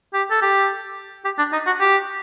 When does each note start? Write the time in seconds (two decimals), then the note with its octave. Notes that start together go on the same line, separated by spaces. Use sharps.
0.14 G4
0.31 A4
0.42 G4
1.25 G4
1.38 D4
1.53 D#4
1.67 F#4
1.80 G4